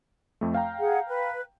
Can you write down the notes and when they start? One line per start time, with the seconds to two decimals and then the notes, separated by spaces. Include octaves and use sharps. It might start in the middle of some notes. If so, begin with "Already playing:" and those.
0.41 F2 A3
0.54 F5 G5 A#5
0.79 G#4 F#5
1.07 B4